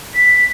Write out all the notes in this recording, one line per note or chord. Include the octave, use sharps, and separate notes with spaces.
B6